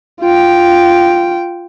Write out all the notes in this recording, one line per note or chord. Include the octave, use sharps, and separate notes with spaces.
F4 G5